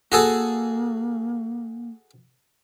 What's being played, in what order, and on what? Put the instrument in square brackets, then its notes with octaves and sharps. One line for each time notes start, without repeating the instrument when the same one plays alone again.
[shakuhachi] A#3 [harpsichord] F#4 G#4 A4